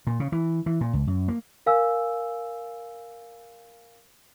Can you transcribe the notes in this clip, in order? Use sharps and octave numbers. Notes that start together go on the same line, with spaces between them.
A#2
C#3
E3
E3
A#2
C#2
F#2
A#3
A#4 F5 G#5 E6